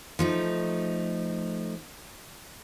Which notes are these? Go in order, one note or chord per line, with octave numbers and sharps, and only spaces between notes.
F3 A3 D#4